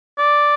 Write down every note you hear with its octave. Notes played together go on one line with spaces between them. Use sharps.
D5